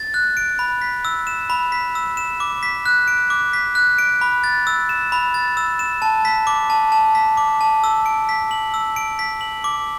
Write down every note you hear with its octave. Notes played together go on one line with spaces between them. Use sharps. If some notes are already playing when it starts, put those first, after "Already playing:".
Already playing: A6
F#6
D7
B5
B6
E6
E7
B5
B6
E6
E7
D6
B6
F#6
D7
D6
B6
F#6
D7
B5
A6
E6
E7
B5
A6
E6
E7
A5
B6
D6
A5
A5
B6
D6
A5
E6
D7
B6
F#7
E6
D7
B6
F#7
D6